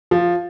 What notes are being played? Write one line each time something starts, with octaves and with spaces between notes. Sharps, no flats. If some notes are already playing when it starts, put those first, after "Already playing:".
F3